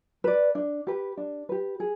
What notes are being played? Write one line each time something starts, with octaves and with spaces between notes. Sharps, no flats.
B4 D5
D4
G4 B4
D4
G4 B4
G#4